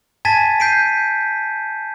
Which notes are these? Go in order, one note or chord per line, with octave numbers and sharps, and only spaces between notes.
G#5 A5 G#6 A6 B6 D#7
G6 B6 C7 D7 D#7